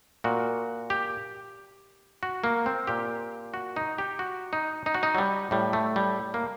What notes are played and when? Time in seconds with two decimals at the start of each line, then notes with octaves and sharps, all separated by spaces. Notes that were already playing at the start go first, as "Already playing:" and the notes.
0.24 A#2 F#4
0.90 G4
2.23 F#4
2.44 A#3
2.66 C4
2.87 A#2 G4
3.54 F#4
3.76 D#4
3.98 G4
4.19 F#4
4.53 D#4
4.86 D#4
4.94 F#4
5.03 D#4
5.15 F#3
5.18 G3
5.51 A2 G3
5.73 A3
5.96 G3
6.34 A#3